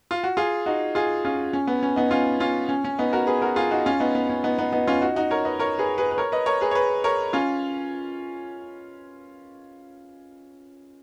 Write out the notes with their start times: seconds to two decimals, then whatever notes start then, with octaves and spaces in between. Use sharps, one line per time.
0.11 F4
0.24 F#4
0.37 F4 G#4
0.66 D#4 F#4
0.95 F4 G#4
1.25 C#4 F4
1.53 C#4
1.67 B3
1.83 C#4
1.96 B3 D#4
2.11 C#4 F4
2.40 C#4 F4
2.69 C#4
2.84 C#4
2.98 B3 D#4
3.13 F#4 A#4
3.27 G#4 B4
3.42 F#4 A#4
3.56 F4 G#4
3.71 D#4 F#4
3.86 C#4 F4
4.00 B3 D#4
4.15 B3
4.30 C#4
4.43 B3 D#4
4.58 B3 D#4
4.73 B3 D#4
4.88 C#4 F4
5.02 D#4 F#4
5.16 D#4 F#4
5.31 A#4 C#5
5.45 B4 D#5
5.59 A#4 C#5
5.79 G#4 B4
5.98 G#4 B4
6.11 B4
6.18 A#4 C#5
6.32 B4 D#5
6.46 A#4 C#5
6.61 G#4 B4
6.71 C#5
6.75 G#4 B4
7.04 A#4 C#5
7.33 C#4 F4